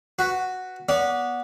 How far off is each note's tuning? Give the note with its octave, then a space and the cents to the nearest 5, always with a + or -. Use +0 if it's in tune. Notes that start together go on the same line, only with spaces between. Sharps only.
F#4 +0 B4 +0
B3 -15 D5 -40